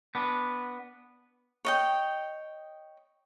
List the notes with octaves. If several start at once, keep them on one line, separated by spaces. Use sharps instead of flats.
B3 D4
C#5 D#5 G5